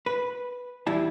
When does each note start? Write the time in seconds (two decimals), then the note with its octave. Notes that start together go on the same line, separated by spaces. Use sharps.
0.06 B4
0.87 E2 G3 E4 A5